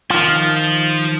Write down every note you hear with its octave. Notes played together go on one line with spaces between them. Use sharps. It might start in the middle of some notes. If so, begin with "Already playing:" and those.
D#3 F3 F4